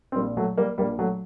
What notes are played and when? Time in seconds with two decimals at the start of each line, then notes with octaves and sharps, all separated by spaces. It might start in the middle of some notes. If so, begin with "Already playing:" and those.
0.12 C4
0.16 A#1 G3 A#3
0.20 A#2
0.37 F#3 A3
0.58 G3 A#3
0.78 A#1 A#2 G3 A#3
0.99 F#3 A3